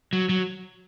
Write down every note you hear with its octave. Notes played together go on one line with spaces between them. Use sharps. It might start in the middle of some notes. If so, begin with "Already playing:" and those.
F#3
F#3